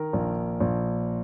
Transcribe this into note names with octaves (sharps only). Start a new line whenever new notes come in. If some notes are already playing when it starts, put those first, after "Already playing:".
Already playing: D#3 A#4
A#1
A#1